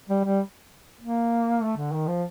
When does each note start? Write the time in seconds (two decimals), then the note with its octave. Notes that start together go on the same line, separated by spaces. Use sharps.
0.09 G3
0.25 G3
1.01 A#3
1.62 A3
1.77 D3
1.92 D#3
2.08 F3